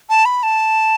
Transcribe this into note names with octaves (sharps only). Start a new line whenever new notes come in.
A5
B5
A5